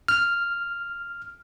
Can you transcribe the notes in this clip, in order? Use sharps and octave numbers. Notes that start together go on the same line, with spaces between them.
F6